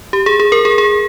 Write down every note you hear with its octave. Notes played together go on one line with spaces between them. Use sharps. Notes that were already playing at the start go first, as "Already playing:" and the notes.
G4
G#4
G#4
A#4
G#4
G#4